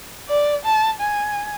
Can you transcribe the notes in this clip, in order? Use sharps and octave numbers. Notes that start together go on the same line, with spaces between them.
D5
A5
G#5